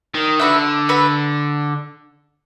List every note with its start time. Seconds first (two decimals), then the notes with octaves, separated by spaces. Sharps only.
0.14 D#3
0.39 D3 F#4 B4 E5
0.89 F#4 B4 E5